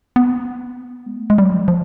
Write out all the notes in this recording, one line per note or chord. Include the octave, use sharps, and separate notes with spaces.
B3
G#3
A3
G#3
G3
F#3
F3
F3